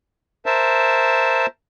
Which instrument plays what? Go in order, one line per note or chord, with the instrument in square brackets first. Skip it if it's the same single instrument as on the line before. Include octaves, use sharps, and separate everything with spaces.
[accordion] A#4 C5 E5 A5